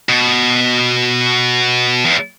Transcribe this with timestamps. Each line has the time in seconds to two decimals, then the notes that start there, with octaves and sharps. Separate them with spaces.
0.09 B2
2.05 E2